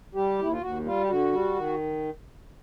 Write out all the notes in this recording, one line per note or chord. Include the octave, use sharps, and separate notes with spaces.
G3 G4
D#2 E4
F4
D#2 F#4
G3 F4
G4
D3 F#4
G3
D#3